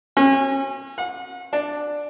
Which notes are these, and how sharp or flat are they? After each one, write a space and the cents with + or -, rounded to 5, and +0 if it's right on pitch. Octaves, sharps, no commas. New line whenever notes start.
C#4 -35
F#5 -35
D4 +5